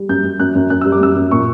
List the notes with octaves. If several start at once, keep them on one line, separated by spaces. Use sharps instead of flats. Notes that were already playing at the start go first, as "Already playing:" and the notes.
Already playing: G3
F#2 G6
F#2
F#2 F#6
F#2
F#2 F#6
G3 E6
D6
F#2 E6
F#2
A#2 C#6